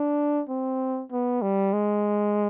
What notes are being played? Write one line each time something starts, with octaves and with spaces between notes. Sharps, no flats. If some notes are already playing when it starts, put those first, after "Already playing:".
Already playing: D4
C4
B3
G3
G#3